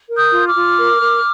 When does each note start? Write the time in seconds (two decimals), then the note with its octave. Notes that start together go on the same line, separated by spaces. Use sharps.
0.08 A#4
0.16 D#6 G6
0.32 F4
0.47 D6 F6
0.54 F4
0.78 A#4
1.01 A#4